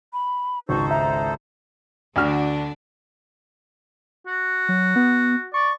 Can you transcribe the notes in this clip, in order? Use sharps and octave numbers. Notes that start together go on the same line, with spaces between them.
B5
G#1 C#2 D#4 A4 C5 C#6
E5 A#5
D2 D3 D4 F#4 F6
F#4
F#3
B3
D5 C#6